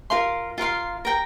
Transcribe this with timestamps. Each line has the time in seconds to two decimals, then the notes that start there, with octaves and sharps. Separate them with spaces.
0.10 F4 A#4 F5 C6
0.58 F4 A#4 F5 C6
1.05 A#4 G5 A#5